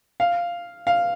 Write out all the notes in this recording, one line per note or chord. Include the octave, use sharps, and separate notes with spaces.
F5
F5